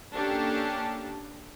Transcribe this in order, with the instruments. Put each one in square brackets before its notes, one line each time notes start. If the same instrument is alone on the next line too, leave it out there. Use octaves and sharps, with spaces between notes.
[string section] A#3 C#4 D4 G4 A4